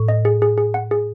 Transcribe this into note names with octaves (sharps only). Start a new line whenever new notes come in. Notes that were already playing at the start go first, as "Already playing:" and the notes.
Already playing: A2
D#5
G#4
G#4
G#4
F#5
G#4